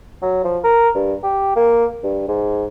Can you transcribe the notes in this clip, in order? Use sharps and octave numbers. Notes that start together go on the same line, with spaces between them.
F#3
F3
A#4
G2
G4
A#3
G2
G#2